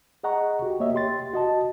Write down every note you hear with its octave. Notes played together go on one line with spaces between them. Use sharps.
G#4 D#5 F#5 A#5 C#6
F#4 G4
A#3 C#5 D#5 E5
G4 C6 A6
F#4 D#5 A5